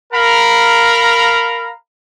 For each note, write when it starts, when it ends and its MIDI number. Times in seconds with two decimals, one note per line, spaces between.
0.12 1.70 70
0.12 1.70 77
0.12 1.70 82
0.12 1.70 83